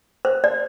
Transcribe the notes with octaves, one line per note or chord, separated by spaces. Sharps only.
C5
D5